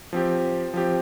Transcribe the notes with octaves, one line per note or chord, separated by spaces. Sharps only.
F3 C4 G4
F3 C4 G4